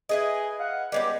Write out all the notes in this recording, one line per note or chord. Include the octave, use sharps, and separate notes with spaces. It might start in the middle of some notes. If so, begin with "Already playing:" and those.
E4 G#4 B4 D#5
F5 F#5
C#2 G3 G#3 B3 G4